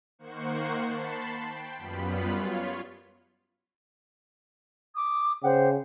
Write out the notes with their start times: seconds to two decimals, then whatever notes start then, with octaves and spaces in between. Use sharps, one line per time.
0.19 D#3 A#3 C5 F#5 C#6
0.86 A5 B5 C6 C7
1.42 G5
1.78 F#2 G3 B3 F4 B5 B6
2.29 F4 C#5
4.95 D6 D#6
5.43 C#3 C5 F#5 G5